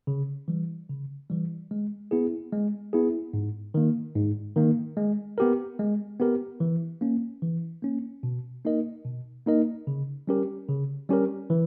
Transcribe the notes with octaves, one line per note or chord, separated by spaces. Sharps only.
C#3
E3 G3
C#3
E3 G3
G#3
B3 E4 G#4
G#3
B3 E4 G#4
G#2
D#3 A#3
G#2
D#3 A#3
G#3
B3 G4 A#4
G#3
B3 G4 A#4
E3
A#3 C#4
E3
A#3 C#4
B2
A#3 D#4 A#4 D#5
B2
A#3 D#4 A#4 D#5
C#3
G3 C#4 G4 A#4
C#3
G3 C#4 G4 A#4
E3